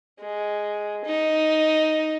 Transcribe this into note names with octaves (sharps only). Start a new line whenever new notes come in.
G#3
D#4